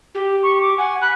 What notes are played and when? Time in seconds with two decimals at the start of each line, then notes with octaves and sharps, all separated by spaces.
0.15 G4
0.43 C#6
0.61 D6
0.78 F#5 G#5
1.01 B5 F#6